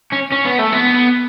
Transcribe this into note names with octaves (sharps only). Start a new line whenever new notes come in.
C#4
C#4
B3
A3
B3